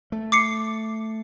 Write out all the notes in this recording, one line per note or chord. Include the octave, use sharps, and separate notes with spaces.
A3
D6 C7 C#7